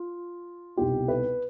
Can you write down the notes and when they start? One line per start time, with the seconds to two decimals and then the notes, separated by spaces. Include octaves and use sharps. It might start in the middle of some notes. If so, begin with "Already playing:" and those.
Already playing: F4
0.76 C2 B2 B3 D#4 G4
1.08 B4